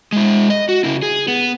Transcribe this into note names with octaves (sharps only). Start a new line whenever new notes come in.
G#3 E4
D#5
F#4
C#3 E4
G#4
B3